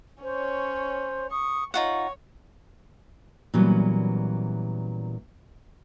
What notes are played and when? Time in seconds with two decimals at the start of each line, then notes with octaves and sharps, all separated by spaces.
0.23 C#4 C5 C#5
1.31 C#6 D#6
1.74 D#4 F4 C#5 F#5 C#6
3.54 A#2 E3 F#3 G3 B3 C#4